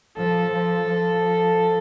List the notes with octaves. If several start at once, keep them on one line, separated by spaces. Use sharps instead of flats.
F3 A4
F3
F3